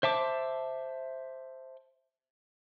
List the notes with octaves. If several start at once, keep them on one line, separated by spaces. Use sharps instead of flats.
C5 E5 A5 D6